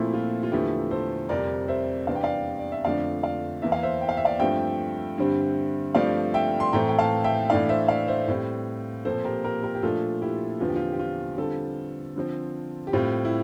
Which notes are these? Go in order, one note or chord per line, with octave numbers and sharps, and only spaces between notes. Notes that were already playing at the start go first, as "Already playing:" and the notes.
Already playing: A#2 F3 A3 C4 E4
F4
F4
E2 D3 F3 A3 E4 G4
A4 C5
F2 C3 G3 C4 A#4 D5
C5 E5
E2 C3 G3 D4 F5
G5
D5 F5
D5
E5
F2 D3 F3 A3 D4 D5 F5
D5 F5
E2 E3 A#3 E5
F5
C5 E5
G5
F5
E5
D5 F5
G2 F3 A3 C4 E5 G5
G2 D3 G3 C4
G2 F3 A3 C4 D5 F5
E5 G5
C6
A2 E3 A3 C4 G5 A#5
G5
F5 A5
E5 G5
A2 E3 A3 D4 D5 F5
C5 E5
D5 F5
C5 E5
A2 G3 C4
A#2 F3 C4 A4 C5
G4 A#4
G4 A#4
G4 A#4
G4
A#2 F3 A3 D4 F4 A4
E4 G4
E2 D3 F3 C4 F4
G4
F4
G4
F4
D3 G3 C4 F4 A4
D3 F3 C4
G4
A2 G3 C4 F4
E4